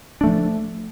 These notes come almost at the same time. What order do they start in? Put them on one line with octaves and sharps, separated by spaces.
D4 A3 F3